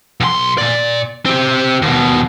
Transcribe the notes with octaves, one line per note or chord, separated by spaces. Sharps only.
B1 C6
A#2 D5
C4 G4
D#2 B2